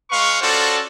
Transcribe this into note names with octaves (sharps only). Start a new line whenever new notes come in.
G#3 B4 F5 C#6
C#4 F4 F#4 A4 C5 D5